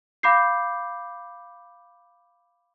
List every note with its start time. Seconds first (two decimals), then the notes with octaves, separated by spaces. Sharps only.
0.23 F5 B5 D6 G6 C7